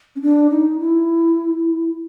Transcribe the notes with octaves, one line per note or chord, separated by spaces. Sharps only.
C#4
D4
D#4
E4